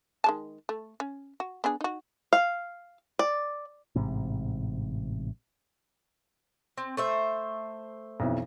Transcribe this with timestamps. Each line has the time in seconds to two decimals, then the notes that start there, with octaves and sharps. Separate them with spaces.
0.24 D#3 G#3 A5
0.69 A3
1.00 C#4
1.40 F#4
1.64 B3 D4 G#4
1.81 D#4 F#4
2.33 F5
3.19 D5
3.96 A1 G#2 C3
6.78 C4
6.97 A3 C5 E5
8.20 B1 F2 E3